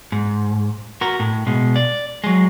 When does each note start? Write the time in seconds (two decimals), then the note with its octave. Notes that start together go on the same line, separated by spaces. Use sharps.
0.12 G#2
1.01 F#4 A#4
1.20 A2
1.47 B2 G#3
1.76 D5
2.24 F#3 G#3